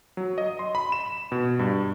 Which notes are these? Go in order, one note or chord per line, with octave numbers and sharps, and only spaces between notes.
F#3
D#5
C6
B5
E7
B2
G2